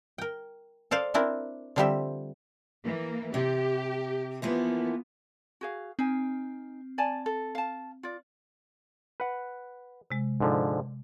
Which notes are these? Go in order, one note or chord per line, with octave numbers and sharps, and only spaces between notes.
A#4 G5
A4 C5 D5 F5
C4 D4 E4 A#4
D3 F3 G3 C4 G4 E5
E3 A#3
C3 G4
E3 F3 A#3 B3
F#4 G#4 F5
C4 D#4 G#5
D5 G#5 A5
A4
F5 A5
F4 D5
B4 F#5
C3 G#3
G#2 D3 F3